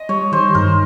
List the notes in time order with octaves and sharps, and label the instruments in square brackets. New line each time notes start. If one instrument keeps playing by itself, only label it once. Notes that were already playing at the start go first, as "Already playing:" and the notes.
Already playing: [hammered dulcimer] D#5
[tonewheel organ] G3 [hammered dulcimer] C#5
[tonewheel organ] D#3 [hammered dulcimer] C5
[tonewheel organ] G2 [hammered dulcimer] A#4